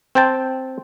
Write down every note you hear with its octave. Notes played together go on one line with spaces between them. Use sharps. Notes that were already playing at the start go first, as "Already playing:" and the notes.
C4 C5 G5 A5